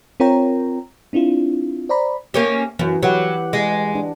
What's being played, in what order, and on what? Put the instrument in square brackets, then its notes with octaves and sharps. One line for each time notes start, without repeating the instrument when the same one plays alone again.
[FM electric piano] C4 F4 A#4 C#5 G5 A#5
C4 D4 E4 F4
C5 D5 A#5 B5
[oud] A#3 C#4 G4
[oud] F#2 [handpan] E3
[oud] F#3 [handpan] G4 B4 F#5
[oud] G#3
[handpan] D4